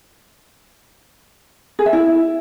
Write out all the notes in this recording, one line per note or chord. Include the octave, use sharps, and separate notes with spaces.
G#4
E5
E4